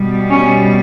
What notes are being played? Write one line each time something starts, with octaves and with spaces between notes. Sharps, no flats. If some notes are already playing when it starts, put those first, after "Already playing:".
Already playing: B2 G3
C#4